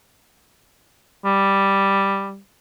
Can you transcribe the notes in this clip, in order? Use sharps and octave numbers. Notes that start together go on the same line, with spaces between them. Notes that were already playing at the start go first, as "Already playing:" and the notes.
G3